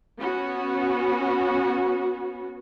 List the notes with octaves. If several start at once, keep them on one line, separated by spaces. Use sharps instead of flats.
B3 C#4 F#4